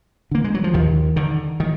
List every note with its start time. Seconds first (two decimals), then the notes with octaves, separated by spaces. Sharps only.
0.31 D3 A#3
0.44 G#3
0.54 F#3
0.64 F3
0.74 D#2 D#3
1.16 D3 D#3
1.60 D#3